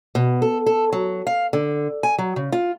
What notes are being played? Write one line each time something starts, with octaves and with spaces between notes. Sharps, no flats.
B2
A4
A4
F#3
F5
D3
G#5
F#3
C#3
F4